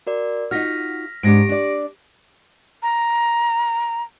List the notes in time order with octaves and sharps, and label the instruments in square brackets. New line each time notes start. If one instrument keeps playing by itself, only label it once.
[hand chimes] F#4 A#4 D5
[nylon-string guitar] D#4 F4 F#4 [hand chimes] F6 A#6 B6
[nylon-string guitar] G#2 D4 [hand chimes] G4 A#6 D7
[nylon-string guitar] D4 D5
[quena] A#5